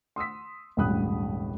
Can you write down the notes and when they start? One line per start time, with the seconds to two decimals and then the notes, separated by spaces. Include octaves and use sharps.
0.16 C6 D#6 E6 B6
0.77 E1 A1 G2 B5 D#6 F#6